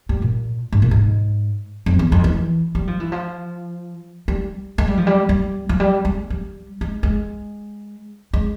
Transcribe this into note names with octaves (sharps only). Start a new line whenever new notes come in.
G3
A#2
G#2
A#2
G#2
F2
E2
F2
E3
G3
F3
E3
F3
G3
G#3
G3
F3
G3
G3
F3
G3
G#3
G3
G#3
G#3
G#3